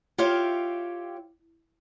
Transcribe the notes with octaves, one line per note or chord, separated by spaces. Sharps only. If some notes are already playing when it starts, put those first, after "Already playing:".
F4 G4 C#5 E5 F5 G5